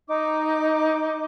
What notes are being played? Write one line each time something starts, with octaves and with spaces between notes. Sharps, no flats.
D#4 D6